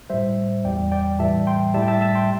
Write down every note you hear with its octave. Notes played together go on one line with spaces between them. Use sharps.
A2 G3 C5 E5
E2 E3 G3 D5 G5
D5 G5
A2 E3 G3 E5 A5
G5 C6
A2 G3 E5 A5
G5
E5 A5
E5 A5
G5 C6